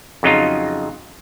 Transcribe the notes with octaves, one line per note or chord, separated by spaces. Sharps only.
F2 C#3 F#3 D#4 F4